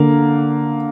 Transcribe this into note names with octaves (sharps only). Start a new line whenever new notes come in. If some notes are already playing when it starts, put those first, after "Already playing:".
Already playing: D3 A#3